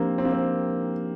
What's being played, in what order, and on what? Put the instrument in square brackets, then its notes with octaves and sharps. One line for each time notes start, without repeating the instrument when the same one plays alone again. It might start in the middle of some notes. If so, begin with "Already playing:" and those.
Already playing: [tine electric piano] F3 D4 G4 A#4 [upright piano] A#3 C4
[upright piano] C4
A#3
C4